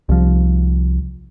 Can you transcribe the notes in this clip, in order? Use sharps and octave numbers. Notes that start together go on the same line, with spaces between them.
C2 F3